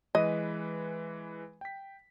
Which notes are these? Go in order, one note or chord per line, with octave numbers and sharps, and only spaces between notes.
E3 G#3 B4 D#5
G5 B6